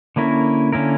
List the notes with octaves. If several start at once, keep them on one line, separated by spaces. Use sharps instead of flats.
D3 A#3 C#4 E4 A#4
D3 A#3 C#4 E4 A#4